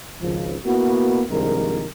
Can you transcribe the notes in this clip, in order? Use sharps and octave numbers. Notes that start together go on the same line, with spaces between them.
G#1 C#2 F3
A#3 B3 E4 F#4
C2 G2 D#3 F3 G#3 A#4